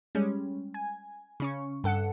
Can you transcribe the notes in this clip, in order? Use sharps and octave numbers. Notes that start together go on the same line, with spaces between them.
G3 G#3 C#4
G#5
C#3 C#4 C#6
G2 A4 F#5 C#7